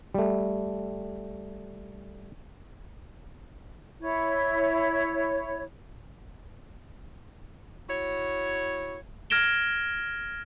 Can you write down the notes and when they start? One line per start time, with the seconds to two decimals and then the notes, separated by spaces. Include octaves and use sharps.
0.14 G3 A3
4.00 E4 C#5
7.89 E4 F#4 C#5
9.30 F6 G#6 A#6 D7 E7 G7